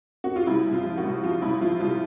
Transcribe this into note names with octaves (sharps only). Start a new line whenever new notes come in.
F#4
F4
C2 E4
C2
F4
F3
F#4
C2
F3 F4
C2 E4
F3 F4
C2 F4